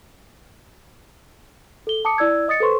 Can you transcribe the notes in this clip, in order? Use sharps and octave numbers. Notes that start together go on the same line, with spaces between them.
A4 G7
A5 D6 D#6 C#7
E4 D5 E6 G#6
D#5 D#6 A6 C#7
A4 B4 C5 C6 C#6